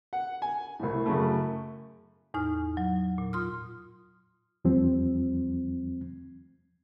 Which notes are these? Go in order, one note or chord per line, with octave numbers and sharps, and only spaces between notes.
F#5
G#5
C2 A2
F#2 C#3 A3
E2 A2 D#4 F6
F#3
A#2
F4 C6 D#6 F6
E2 F3 G3 C4